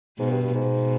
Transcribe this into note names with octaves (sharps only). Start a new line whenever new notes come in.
G#2 B2
G2
G2
G#2
B2